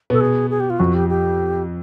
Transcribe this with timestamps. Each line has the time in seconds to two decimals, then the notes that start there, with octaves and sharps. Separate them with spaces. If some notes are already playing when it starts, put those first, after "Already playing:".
0.10 B2 B3 A4
0.20 G#4
0.50 G#4
0.60 G4
0.70 F4
0.79 F2 F3 F#4
0.94 G4
1.09 G4